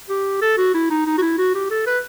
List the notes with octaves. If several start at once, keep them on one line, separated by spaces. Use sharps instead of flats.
G4
A4
F#4
E4
D#4
D#4
F#4
E4
F#4
G4
A4
B4